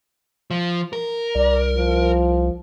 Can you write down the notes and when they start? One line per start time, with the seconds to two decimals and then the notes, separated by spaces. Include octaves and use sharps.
0.51 F3
0.93 A#4
1.35 C2 D5
1.76 F3